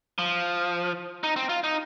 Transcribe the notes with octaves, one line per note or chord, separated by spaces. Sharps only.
F3
D#4
C4
F4
D#4